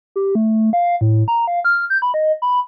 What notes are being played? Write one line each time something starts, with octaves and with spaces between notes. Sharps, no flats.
G4
A3
F5
A2
A#5
F5
F6
G6
B5
D#5
B5